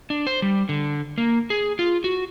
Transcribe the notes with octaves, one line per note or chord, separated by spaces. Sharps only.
D4
C5
G3
D3
A#3
G#4
F4
F#4